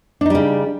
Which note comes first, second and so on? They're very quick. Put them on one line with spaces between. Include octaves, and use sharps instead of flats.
D4 D#4 G3 C#3